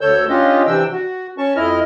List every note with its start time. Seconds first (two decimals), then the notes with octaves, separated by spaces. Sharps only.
0.01 D2 D3 A4 C#5 E6 G6
0.29 C#4 D4 F4 G4 D#5
0.67 C3 E3 D4 G5 E6
0.92 F#4
1.38 C#4 A5 C#6
1.57 F2 E4 D#5 F6